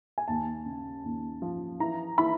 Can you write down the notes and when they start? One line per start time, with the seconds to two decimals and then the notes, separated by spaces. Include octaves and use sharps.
0.18 G#5
0.28 D#2 A5
0.66 C#3
1.04 D#2
1.42 F3
1.80 E3 A#5
2.18 E3 B5